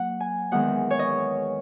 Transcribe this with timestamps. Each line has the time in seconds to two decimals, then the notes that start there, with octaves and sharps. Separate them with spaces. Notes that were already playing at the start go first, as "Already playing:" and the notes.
Already playing: F#3 A#3 F#5
0.20 G#5
0.52 E2 D#3 G#3 F#5
0.91 C#5
0.99 D#5